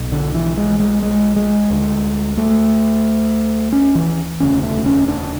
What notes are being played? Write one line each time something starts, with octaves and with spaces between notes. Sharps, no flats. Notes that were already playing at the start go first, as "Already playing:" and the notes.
Already playing: B1 B2
D3
E3
G#3
G#3
G#3
G#3
D2 D3
A3
C#4
E3
E1 D2 C#3 C#4
A3
C#4
D4